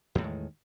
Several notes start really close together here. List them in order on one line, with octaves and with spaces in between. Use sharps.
E2 A2 G#3 D#3